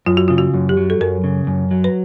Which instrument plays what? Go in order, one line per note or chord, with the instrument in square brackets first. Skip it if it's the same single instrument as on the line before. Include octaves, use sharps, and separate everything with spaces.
[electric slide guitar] F#2 [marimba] F4
[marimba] F#4
[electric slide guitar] C#3 [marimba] F4
[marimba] F#4
[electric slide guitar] F#2
[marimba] G4
[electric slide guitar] F#3
[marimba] A4
[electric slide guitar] F#2 [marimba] A#4
[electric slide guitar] C#3
F#2
F#3
[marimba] B4